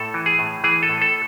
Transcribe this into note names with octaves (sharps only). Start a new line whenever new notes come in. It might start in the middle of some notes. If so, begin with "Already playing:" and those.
Already playing: A2 A4
E3
G#4
A2
E3 G#4
A4
A2
A4